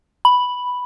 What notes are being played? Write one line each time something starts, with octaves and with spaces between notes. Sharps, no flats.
B5